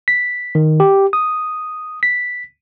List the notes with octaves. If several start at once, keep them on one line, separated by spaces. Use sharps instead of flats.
B6
D#3
G4
D#6
B6